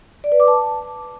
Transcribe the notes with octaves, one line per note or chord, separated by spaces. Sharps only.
D5
B4
D6
A5